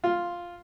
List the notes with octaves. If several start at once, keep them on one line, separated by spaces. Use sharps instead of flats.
F4